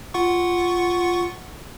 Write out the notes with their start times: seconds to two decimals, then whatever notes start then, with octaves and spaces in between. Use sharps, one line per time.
0.14 F4 F#5 C#6